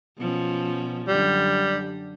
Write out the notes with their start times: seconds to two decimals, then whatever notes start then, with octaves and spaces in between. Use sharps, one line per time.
0.17 B2 F3 C#4
1.08 F#2 D3 G3